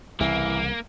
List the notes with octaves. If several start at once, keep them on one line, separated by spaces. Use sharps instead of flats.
C2 C#3 E3 A#3